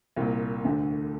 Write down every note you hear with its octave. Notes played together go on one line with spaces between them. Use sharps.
C2 A#2
D2 D3